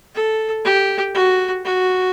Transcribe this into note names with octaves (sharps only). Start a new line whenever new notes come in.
A4
G4
F#4
F#4